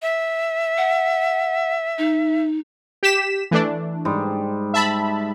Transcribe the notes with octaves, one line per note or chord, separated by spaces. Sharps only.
E5
F#5
D#4
G4 B6 E7
E3 A3 D4
G#2 G3
E5 A5 B5